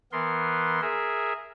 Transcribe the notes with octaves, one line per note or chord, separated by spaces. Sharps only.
E3 B3 A#4 C6
G#4 A#4 E5